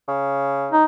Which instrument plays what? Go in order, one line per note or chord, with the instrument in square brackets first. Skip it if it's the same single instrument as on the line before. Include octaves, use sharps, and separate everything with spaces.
[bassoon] C#3
[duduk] D#4